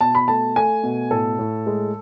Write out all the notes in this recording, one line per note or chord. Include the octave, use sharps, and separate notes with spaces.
B2 A5
B5
A3 A5
A3 G#5
B2
A2 A4
A2
G#3